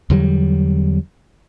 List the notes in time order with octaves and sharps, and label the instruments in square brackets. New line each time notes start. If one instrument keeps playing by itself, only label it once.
[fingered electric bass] E2 D3 F#3 G3